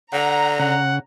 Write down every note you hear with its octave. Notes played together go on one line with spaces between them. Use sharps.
D3 F#5 A#5
C#3 F#5